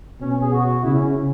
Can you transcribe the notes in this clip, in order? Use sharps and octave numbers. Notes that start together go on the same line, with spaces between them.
B2 C#4
C#4
G#4
F#4
C#3 E4
C#4
C#4